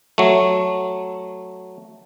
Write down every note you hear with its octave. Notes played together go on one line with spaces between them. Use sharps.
F#3 A3